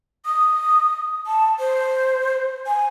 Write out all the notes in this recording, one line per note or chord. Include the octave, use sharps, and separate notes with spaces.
D#6
A5
C5
G#5